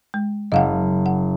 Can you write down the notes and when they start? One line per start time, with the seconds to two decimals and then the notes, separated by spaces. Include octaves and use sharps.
0.14 G#3
0.52 F#1 D#5 F5 F#5
1.06 F#5